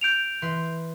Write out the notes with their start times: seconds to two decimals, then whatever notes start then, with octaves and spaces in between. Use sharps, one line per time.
0.01 G6 D7 F7
0.42 E3 B4 C6